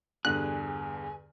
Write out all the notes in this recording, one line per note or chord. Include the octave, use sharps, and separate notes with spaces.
E2 G2 D3 G#4 F#6